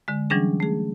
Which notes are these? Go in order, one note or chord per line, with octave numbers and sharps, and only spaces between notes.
D3 G#3
E3 F#3 G3 C#4 D4 G#4
A3 G#4